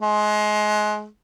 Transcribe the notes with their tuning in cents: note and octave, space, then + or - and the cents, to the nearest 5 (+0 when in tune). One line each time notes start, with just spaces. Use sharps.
G#3 +25